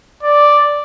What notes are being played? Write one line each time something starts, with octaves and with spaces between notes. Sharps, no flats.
D5